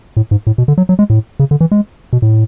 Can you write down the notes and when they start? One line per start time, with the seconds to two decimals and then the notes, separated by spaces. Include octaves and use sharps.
0.17 A2
0.31 G#2
0.47 A2
0.58 B2
0.68 D3
0.78 F#3
0.89 F#3
0.99 G#3
1.10 A2
1.40 C#3
1.51 D3
1.61 E3
1.71 G#3
2.13 B2
2.22 A2